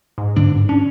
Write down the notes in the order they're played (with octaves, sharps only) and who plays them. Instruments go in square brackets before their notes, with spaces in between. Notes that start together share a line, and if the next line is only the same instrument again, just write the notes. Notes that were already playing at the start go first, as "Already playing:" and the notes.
[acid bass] G#2
[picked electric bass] G2 D3 D4
[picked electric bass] C#4 [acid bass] D4